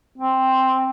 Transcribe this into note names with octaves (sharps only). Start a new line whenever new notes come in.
C4